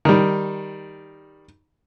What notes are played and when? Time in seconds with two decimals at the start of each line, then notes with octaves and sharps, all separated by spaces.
0.05 D#3 G3